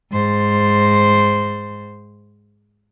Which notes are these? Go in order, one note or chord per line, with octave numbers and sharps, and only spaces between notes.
G#2 C5